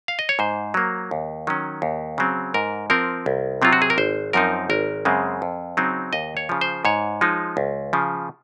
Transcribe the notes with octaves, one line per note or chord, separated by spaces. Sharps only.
F5
D#5
C#5
G#2 C5
F#3 A#3
D#2
D#3 F#3 C#4
D#2
C#3 F#3 C4
G#2 A#4
F3 C4 A#4
C2
C3 F#3 C4 F4
F#4
G#4
A#4
G#1 C5
F#2 F3 C4 D#4 A#4
G#1 A#4
F#2 C#3 G#3 C4
F2
C#3 F#3 C4 D#4
D#2 D#5
C#5
C#3 F3
C5
G#2 C#5
F3 G#3 D#4
C#2
C#3 F3